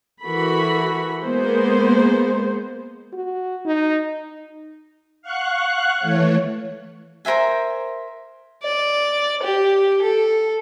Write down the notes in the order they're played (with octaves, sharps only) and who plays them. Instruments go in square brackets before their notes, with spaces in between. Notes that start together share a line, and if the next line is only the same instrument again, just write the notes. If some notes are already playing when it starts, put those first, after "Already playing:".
[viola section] E3 F#4 A4 A#4 B5
G#3 A#3 B3 G#4 A#4 C5
[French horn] F#4
D#4
[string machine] F5 F#5 C#6 F#6
E3 A3 C#5
[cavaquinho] A#4 C5 E5 G#5
[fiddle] D5
G4
A4